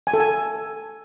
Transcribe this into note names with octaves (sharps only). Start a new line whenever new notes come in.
G#5
A4
G#5